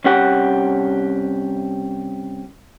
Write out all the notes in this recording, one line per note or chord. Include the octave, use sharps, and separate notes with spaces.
C2 C#4 G4 F#5